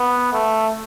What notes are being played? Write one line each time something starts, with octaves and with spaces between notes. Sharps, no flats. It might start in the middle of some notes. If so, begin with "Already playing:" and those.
Already playing: B3
A3